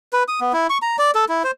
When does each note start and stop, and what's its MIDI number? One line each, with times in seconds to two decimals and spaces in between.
0.13 0.23 71
0.28 0.40 87
0.41 0.53 59
0.53 0.67 64
0.70 0.78 85
0.82 0.96 82
0.99 1.11 74
1.15 1.25 69
1.29 1.43 64
1.44 1.51 72